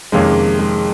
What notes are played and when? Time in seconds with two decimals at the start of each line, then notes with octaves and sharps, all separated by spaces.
0.12 F2 C3 D#3 G#3 A#3 C#4
0.59 G#3